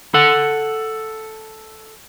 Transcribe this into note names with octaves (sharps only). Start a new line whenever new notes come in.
A4 F#5